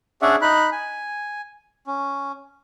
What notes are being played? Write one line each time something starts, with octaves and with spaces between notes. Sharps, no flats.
C#4 D4 G#4 D5 E5 F#5
D#4 B5 F#6
G#5
C#4